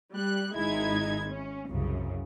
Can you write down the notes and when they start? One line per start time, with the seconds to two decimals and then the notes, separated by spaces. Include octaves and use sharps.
0.12 G3 F#6
0.55 G#1 G#3 D#4 E4 G#6
1.29 C#4
1.69 C2 F#2 C#3